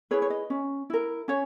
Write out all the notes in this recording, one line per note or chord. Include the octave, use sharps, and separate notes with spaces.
E4 G#4 B4 C#5
C#5
D#5
C#4
E4 A#4
C#4 C#5